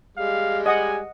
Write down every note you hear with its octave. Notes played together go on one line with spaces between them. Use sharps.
G3 G#3 F5
D#5 F#5 G#5 D#6